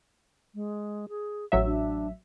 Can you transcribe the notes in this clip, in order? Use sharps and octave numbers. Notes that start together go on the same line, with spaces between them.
G#3
G#4
A1 F#3 E5
D4